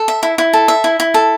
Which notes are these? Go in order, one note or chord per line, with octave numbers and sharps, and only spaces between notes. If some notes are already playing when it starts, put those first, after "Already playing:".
Already playing: A4
E5
E4
E4
A4
E5
E4
E4
A4